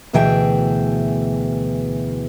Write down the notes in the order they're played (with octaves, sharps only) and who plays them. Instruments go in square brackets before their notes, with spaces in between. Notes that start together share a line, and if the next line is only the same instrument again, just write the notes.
[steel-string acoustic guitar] D2 B2 E3 G#4 E5 G5